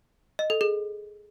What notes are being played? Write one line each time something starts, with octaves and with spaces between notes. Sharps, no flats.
D#5
A4
G#4